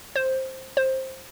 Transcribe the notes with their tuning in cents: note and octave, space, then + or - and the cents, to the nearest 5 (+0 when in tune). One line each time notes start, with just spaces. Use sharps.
C5 +10
C5 +15